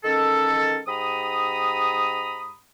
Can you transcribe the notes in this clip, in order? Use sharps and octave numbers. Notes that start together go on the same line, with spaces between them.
D#3 G#3 C#4 A4
G#2 G4 A#5 B5 D#6